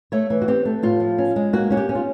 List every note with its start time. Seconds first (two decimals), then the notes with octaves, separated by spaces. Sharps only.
0.12 A3 C#5
0.30 E3
0.42 F#4
0.48 C4 G4
0.65 A3
0.83 A2 F4
1.00 F3
1.18 C#4
1.36 G#3
1.53 A#3 F#4
1.70 C#4 F#4
1.77 G4
1.89 C#4
1.95 F4